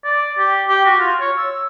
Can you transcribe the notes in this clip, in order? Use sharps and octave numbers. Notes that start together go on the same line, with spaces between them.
D5
G4
G4
F#4
F4
C#5
E6